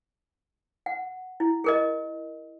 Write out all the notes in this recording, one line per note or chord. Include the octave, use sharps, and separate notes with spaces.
F#5
E4
G#4 A#4 D#5